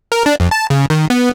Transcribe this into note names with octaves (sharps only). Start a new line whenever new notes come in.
A#4
D4
F2
A5
C#3
D#3
B3